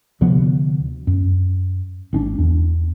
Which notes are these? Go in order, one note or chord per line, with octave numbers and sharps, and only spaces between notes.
D2 C3 F3 B3
F#2
G#1 C4 D4
E2